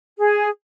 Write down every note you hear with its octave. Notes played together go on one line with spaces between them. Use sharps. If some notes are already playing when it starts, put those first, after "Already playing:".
G#4